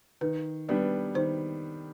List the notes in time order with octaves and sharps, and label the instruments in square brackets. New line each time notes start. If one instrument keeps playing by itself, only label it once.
[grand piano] D#3 [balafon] B4
[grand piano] G3 B3 D4 [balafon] B4
[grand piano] D#3 [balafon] C5